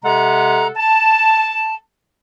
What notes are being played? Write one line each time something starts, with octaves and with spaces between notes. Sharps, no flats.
C3 G#3 A4 F#5 A#5
A5